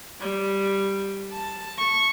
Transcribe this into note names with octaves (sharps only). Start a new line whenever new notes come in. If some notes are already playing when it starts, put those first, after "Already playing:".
G3
A5
C#6